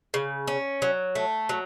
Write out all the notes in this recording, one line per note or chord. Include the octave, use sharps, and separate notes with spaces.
C#3
C#4
F#3
A3
F#3